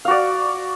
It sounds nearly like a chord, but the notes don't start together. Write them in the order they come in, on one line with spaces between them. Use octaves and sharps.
F5 F#4 D5